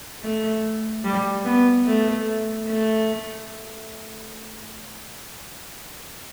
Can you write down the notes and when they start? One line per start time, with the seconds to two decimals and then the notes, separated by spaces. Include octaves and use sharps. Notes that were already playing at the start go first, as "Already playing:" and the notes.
0.23 A3
1.04 G3
1.45 B3
1.86 A3
2.67 A3